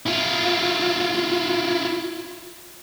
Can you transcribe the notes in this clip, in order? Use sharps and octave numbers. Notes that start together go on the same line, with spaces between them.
E4 F4